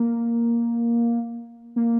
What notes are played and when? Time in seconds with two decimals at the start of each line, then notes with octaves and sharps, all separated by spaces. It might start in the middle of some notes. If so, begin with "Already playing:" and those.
Already playing: A#3
1.76 A#3